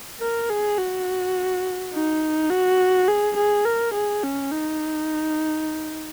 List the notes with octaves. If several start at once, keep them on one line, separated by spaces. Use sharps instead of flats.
A#4
G#4
F#4
D#4
F#4
G#4
G#4
A#4
G#4
C#4
D#4